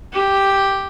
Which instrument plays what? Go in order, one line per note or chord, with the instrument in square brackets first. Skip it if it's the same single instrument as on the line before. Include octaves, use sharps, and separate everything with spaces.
[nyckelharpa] G4